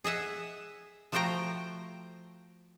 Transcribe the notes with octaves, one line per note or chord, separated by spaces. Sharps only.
G#4 D#5 E5 F#5
F3 A3 F#4 C5 G5 A#5